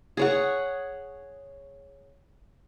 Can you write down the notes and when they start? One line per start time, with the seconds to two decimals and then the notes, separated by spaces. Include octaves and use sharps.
0.17 G#4 C#5 F#5